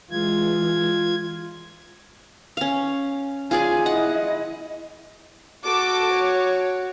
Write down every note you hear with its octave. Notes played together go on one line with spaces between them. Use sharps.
E3 G#3 F4 G#6
C#4 F5
F4 G#4 D5 G#5
E4 D#5 F#5
F#4 A4 D6
C#5